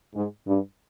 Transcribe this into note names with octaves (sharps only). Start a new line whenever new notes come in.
G#2
G2